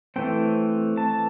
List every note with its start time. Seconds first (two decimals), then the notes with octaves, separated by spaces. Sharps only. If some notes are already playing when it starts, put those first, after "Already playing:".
0.16 E3 A3 C4 G5
0.97 A5